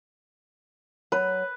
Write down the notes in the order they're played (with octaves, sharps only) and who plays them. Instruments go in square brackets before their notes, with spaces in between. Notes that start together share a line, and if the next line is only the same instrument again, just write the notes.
[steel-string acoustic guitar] F#3 A#5 [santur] B4